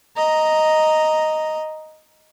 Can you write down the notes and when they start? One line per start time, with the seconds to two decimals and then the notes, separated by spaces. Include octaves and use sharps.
0.17 D#5 A#5